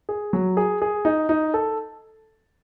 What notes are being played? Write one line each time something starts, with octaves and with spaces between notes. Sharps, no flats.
G#4
F#3
G#4
G#4
D#4
D#4
A4